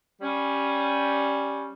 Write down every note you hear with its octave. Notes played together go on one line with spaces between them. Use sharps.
G3 C#4